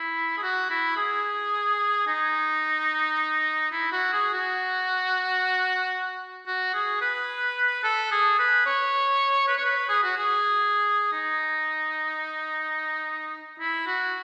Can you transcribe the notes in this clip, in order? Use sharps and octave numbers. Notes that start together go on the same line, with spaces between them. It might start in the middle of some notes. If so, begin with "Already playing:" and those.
Already playing: E4
G#4
F#4
E4
G#4
D#4
E4
F#4
G#4
F#4
F#4
G#4
B4
A4
G#4
B4
C#5
B4
C#5
B4
G#4
F#4
G#4
D#4
E4
F#4